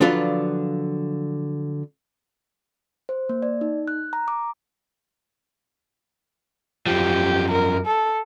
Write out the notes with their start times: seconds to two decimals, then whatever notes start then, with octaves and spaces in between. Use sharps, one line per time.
0.01 D3 F3 F#3 D4 F4 B4
3.09 C5
3.29 A#3
3.42 D5
3.61 D#4
3.88 F#6
4.13 A#5
4.28 D6
6.86 F#2 F3 G4
7.51 A#4
7.87 A4